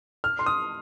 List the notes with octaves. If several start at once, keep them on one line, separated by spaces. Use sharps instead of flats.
F6
C6
D#6